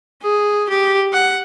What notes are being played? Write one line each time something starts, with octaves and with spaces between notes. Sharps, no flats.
G#4
G4
F#5